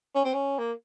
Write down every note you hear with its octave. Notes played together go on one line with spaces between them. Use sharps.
C#4
C4
C#4
A#3